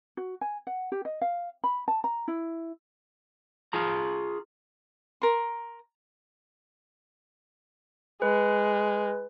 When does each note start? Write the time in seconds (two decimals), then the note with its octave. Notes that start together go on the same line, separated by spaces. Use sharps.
0.17 F#4
0.41 G#5
0.67 F#5
0.92 G4
1.05 D#5
1.22 F5
1.64 B5
1.88 A5
2.04 A#5
2.28 E4
3.73 F4 G#4 A#5
5.22 A#4 C6
8.22 G#3 B4